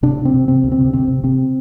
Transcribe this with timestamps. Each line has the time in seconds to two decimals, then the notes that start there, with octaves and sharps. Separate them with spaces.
0.03 C3 D4
0.19 C3
0.25 C4
0.34 C3
0.48 C3 C4
0.64 D2
0.72 C4
0.78 C3
0.93 C3 C4
1.08 C3
1.23 C3 C4